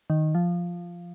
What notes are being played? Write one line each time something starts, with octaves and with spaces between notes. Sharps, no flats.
D#3
F3